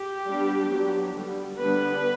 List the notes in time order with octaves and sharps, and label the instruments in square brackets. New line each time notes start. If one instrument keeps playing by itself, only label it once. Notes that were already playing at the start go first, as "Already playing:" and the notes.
Already playing: [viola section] G4
G3 B3 D4
F#3 B3 D4
D3 G3 B3
D3 G3 B3 D4 B4